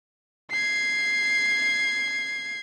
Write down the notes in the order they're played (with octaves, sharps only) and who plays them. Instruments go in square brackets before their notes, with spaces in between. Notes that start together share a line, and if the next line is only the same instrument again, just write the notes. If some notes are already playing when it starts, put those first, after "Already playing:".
[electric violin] G#6 C7